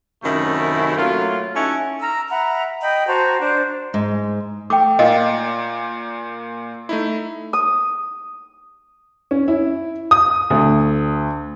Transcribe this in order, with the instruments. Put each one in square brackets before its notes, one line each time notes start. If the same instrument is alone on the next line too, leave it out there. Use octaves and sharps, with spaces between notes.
[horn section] F#2 C3 D#3 A3 E4
F#3 A3 A#3 F4
C#4 D#4 E4 F#4 A4
[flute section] A#5 E6 F6
E5 F#5 A#5 B5
D#5 G5 B5 G6
F#4 C5 A5 A#5
D4 C5
[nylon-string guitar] G#2
[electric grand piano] A3 [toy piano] G5 D6
[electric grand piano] A#2 A#3 [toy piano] D#5 F5
[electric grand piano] A3 D#4 E4
[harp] D#6
[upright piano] C#4
E4
D#6
D2